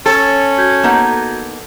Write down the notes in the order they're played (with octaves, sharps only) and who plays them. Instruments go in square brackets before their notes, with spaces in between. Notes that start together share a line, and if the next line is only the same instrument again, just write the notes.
[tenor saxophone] C#4 [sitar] A4 [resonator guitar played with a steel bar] C#5 [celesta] A6
[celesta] F#4 G6 G#6
[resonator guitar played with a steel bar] A#3 B3 D#4